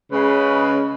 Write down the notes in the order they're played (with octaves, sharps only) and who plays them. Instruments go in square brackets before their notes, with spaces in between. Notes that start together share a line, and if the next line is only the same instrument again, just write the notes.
[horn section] C#3 G#3 B4